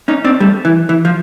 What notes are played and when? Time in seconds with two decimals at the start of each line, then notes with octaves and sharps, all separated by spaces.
0.08 C#4 D#4
0.24 C4 D4
0.40 G3 A3
0.65 E3
0.89 E3
1.05 F3